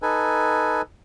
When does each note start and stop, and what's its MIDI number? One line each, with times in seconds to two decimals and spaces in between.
0.02 0.82 63
0.02 0.82 69
0.02 0.82 71
0.02 0.82 80